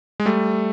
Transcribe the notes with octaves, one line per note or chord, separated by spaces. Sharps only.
G#3
G3 A3